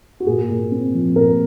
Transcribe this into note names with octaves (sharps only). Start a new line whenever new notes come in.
F#4
A#2 G#4
A#2
C4
F3
A#2 A#4